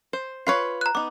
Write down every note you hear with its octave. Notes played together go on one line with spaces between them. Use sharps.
C5
F4 B4 C#5 C7
A#5 F#6
B3 D#4 D6